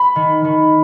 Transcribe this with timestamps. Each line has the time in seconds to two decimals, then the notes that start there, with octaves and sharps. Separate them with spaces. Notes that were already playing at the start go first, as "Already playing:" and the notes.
Already playing: B5
0.16 D#3
0.44 D#3